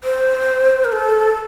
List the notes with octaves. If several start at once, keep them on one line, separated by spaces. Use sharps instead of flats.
C5
A#4
A4